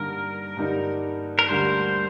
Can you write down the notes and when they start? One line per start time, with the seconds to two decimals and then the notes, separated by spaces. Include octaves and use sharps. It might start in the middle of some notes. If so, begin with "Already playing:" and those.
Already playing: G2 D3 G3 A#3 D#4 A#4
0.56 G2 D3 G3 A#3 D#4
1.39 A#4
1.49 D2 D3 G3 A#3 C5